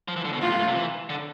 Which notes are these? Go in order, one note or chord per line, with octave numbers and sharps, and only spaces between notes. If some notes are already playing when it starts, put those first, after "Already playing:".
F3
E3
D3
B2
A2 F4
G2
A2
C3
E3
D3